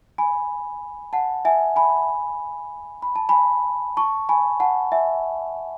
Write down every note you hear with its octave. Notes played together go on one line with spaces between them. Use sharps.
G#5 B5
F#5 A5
E5 G#5
G#5 B5
B5
A5
G#5 B5
A5 C#6
G#5 B5
F#5 A5
E5 G#5